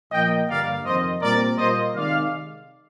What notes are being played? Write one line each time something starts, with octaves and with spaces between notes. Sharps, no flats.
A#2 F3 A#3 D#5 G5
G2 D3 G3 A#3 D5 F5
F2 C3 D#3 C5 D#5
A#2 G3 C4 A#4 D5
A#2 G3 A#3 C5 D#5
C3 D#3 G#3 D5 F5